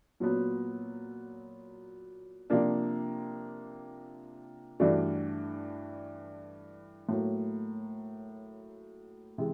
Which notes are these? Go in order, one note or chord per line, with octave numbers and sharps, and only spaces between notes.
A#2 F#3 B3
C3 F3 A#3 D4
G2 E3 A3 D4 F#4
A2 F#3 A#3
C3 E3 G#3